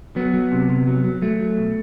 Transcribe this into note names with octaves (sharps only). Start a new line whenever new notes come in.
F#3 B3
F#3
C3
C3
F#3
F#3
F#3 A3
F#3
B2